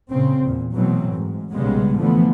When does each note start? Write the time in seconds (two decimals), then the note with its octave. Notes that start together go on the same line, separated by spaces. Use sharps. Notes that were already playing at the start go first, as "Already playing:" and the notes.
0.11 A#2 C#3 C4
0.43 E2 A#2
0.73 B2 E3 F#3 A3 C4
1.14 G#2
1.52 B1 A#2 C#3 G3 G#3 B3
1.98 D3 E3 F3 A3 B3